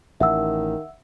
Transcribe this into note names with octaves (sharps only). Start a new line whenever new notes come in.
A1 D#3 E5 F#5 E6